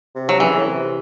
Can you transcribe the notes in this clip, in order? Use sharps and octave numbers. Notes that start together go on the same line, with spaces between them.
C3
F#3
C#3 E3
A2
C3